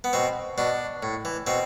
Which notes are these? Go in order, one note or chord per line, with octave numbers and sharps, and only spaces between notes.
B3
B2 C4
B2 D4
A2
E3
B2 C4